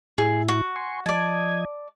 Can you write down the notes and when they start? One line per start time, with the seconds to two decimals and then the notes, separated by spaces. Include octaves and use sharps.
0.18 A2 E4 G#4
0.48 F#4
0.76 G#5 C6 C#6
1.06 F3 D5 D#5 A5 G#6